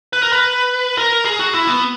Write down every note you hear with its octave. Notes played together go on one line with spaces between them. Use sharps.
B4
A#4
B4
A#4
G#4
F#4
E4
B3